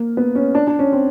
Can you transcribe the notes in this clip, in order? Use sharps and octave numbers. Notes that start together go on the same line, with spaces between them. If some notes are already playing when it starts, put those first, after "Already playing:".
Already playing: A#3
B3
C#4
D4
D4
C#4
C4